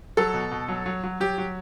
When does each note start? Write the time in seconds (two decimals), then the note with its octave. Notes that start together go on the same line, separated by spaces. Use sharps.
0.17 F#3 A4
0.34 B2
0.51 B2
0.68 F#3
0.86 F#3
1.04 F#3
1.20 F#3 G4
1.38 F#3